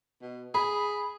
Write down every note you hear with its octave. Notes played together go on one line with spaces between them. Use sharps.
B2
G#4 B5